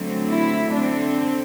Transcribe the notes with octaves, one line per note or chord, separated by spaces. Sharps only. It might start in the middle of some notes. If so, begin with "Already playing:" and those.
Already playing: D3 F#3 A3 C4
E4
D3 A3 C4 D4